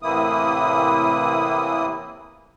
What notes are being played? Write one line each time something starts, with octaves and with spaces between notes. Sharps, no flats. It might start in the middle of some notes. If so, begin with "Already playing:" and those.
A2 C3 E3 A#3 E4 D#6